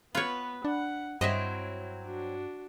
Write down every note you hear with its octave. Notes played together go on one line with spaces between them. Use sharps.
B3 F4 B4 C#5
D4 F#5
G2 F#3 C4 E4 D#5 E5
D4 F#4